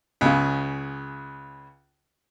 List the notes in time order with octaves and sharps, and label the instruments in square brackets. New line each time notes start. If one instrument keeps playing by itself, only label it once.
[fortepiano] C#2 C#3